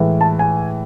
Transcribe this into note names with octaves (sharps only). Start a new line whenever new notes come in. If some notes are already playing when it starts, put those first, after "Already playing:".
Already playing: A2 E3 G#3
A5
G#5